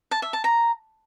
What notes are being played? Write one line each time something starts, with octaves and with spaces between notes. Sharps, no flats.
A5
E5
A5
A#5